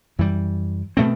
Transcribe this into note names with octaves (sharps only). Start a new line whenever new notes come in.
F#2 E3 G3
B2 A3 C4